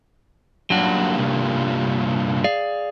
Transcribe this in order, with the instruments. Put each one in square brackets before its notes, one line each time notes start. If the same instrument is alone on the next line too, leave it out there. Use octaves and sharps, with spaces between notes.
[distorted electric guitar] G2 A#2 [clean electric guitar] F#3 F#4
[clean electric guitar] C2
G#4 D5 F5